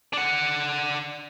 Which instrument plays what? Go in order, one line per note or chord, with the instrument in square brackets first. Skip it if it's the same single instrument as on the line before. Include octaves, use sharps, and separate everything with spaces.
[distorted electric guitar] D4 F#5